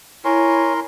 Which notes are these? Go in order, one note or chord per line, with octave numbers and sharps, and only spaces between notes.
E4 A#4 C#5 G#5 C6